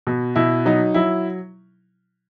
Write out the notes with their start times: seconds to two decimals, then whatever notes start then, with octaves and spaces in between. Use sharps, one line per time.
0.07 B2
0.36 B2 E4
0.66 F#3 D#4
0.94 F#3 E4